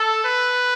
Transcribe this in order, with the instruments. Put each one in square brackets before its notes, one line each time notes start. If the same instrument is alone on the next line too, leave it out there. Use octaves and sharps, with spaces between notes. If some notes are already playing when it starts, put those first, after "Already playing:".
Already playing: [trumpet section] A4
B4